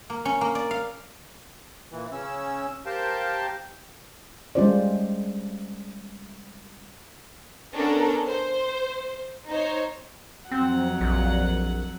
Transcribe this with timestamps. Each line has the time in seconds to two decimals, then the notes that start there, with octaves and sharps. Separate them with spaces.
0.10 A#3
0.25 C#4
0.41 A#3
0.55 D5
0.71 F5
1.91 A#2 E3
2.12 C#3 C#4 E6
2.86 G4 A#4 C5 F5 G5 A5
4.55 G3 G#3 C#4 F4 C5 D5
7.73 B3 C#4 D4 A4 A#4 A#5
8.27 C5
9.50 D#4 C5 C#5
10.51 F2 F#3 C4 F#5
11.01 A#1